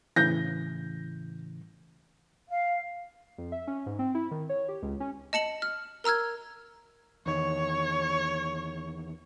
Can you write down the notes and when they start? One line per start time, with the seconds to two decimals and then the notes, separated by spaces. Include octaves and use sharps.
0.16 A2 C#3 E3 G6 A#6
2.49 F5
3.38 F2
3.52 E5
3.67 C#4
3.86 G#2
3.99 C4
4.15 E4
4.31 D#3
4.49 C#5
4.68 G4
4.82 C#2
5.00 C#4
5.33 D#5 A5 C#7 F#7
5.62 F6
6.04 A#4 A#5 E6 F6 G#6
7.26 E2 D#3 C#5